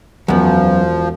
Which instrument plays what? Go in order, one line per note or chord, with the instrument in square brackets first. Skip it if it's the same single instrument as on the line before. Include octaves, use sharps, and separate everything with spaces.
[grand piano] E1 [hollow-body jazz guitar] F#2 B3 [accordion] F3